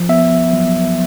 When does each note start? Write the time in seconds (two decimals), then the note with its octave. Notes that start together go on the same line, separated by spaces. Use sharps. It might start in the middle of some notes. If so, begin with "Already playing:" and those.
Already playing: F3
0.09 B3 E5
0.53 F#3